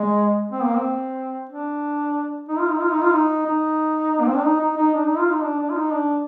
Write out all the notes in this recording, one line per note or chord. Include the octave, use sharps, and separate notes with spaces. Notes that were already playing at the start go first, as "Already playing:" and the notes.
Already playing: G#3
C4
A#3
C4
D4
D#4
F4
D#4
F4
D#4
F4
D#4
D#4
A#3
C4
D4
D#4
D#4
D#4
D4
D#4
F4
D#4
D4
D4
F4
D#4
D4